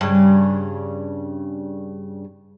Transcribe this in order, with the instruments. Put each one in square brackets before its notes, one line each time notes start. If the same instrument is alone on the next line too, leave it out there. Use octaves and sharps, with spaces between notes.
[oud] G2 C#3